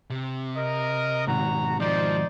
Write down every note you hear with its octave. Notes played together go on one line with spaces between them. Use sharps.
C3
A#4 D#5
G#2 B2 D#3 F#4 A#5
F3 D#4 C5 D5